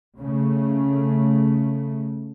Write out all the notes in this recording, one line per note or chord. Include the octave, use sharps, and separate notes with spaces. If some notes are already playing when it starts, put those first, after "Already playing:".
C#3 A3